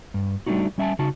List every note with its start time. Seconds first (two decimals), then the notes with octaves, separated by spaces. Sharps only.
0.14 G2
0.46 G3 A3 D4 D#4 F#4
0.78 G3 C#4 E5 F#5 G#5 A5
0.99 C#3 D#4 F#4 A5